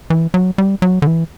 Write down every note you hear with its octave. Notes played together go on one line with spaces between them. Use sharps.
E3
F#3
G3
F#3
D3
E3